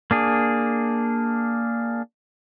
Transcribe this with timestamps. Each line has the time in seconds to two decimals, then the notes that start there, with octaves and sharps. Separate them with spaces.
0.11 A#3 D4 G#4